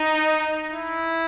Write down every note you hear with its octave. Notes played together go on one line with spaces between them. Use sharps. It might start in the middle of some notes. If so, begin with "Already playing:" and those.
Already playing: D#4
E4